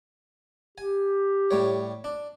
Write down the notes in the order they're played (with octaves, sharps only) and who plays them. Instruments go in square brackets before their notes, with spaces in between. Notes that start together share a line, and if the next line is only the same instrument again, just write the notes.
[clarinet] G4 [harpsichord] G#5
[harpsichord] A2 G3 C#5
D4